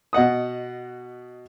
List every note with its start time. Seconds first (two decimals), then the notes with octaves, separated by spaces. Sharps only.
0.13 B2 D#5 F#5 D#6